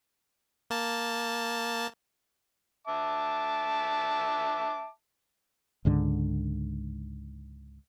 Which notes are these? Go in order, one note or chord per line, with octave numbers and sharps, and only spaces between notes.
A#3 A5
E5 A5 D6
C#2 G#2 D3